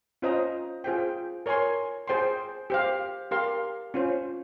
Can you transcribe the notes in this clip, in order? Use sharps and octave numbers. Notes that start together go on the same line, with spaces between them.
C#4 F4 C5 D#5 A#5
F4 G#4 C5 G5
A#4 C#5 G#5 C6
G#4 C5 G5 C6
G4 C5 F5
G4 A#4 F5 C6
C#4 F4 C5